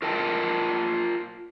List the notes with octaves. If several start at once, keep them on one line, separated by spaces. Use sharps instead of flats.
F4 A#4 D#5 G5 A5